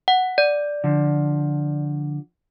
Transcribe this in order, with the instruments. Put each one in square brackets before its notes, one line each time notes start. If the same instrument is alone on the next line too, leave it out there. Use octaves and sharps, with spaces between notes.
[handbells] F#5
D5
[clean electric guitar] D3 F3